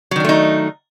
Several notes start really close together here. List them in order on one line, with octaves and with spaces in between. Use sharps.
F#3 D#3 D4 A3 D#4